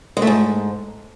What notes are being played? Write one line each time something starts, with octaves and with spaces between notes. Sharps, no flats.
G#3
A3
G#2